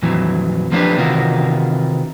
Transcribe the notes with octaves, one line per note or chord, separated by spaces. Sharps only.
F2 A#2 D#3 E3 F#3
F3 A#3 B3 D4 G4 B4
C3 D#3 E3 F4 F#4 A#4